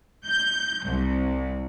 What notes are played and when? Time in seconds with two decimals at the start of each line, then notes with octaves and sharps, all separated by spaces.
0.25 G6
0.84 C2